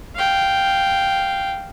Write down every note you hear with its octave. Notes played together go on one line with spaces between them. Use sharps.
F5 G5